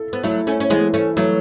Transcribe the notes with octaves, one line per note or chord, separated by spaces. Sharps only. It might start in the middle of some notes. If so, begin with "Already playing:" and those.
Already playing: E4 A4
B3
F#3 A3 E4
A3 C#4
C#4
E3 G#3 B3
A3 C#4
E3 F#3 A3